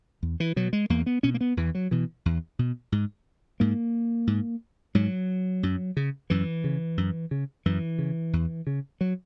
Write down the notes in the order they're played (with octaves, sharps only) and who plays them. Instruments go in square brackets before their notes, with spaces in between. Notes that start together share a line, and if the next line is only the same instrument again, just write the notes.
[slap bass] E2
E3
B2 F#3
G#3
E2 A#3
B3
B2 C#4
A#3
B3
E2 E3
F#3
B2 E3
E2
B2
G#2
G#2 A#3
G#2
G#2 F#3
F#2
C#3
F#2 E3
C#3
F#2
C#3
F#2 E3
C#3
E2
C#3
F#3